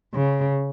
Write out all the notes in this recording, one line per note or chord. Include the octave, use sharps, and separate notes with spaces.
C#3